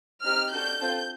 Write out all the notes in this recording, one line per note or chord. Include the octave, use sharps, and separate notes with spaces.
C4 D#4 G4 F6
D4 F#4 A4 G6
C4 F4 A4